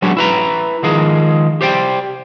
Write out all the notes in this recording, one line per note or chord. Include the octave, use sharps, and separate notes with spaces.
F#3 G#3 B3 C#4 D4 F#4
E4 B4 A#5
D#3 F3 G#3 G#4
G4 C5 D5 G5